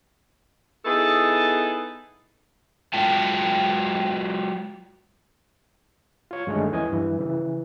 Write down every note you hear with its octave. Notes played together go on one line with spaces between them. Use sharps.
B3 D#4 E4 G#4 A4
F#3 G#3 F4 G5 A5
F4 C#5
G2 D3 D#3 G#3 A3 C#4
D#2 E3 C#4 D#5 G#5
G2 E3
C#3 E3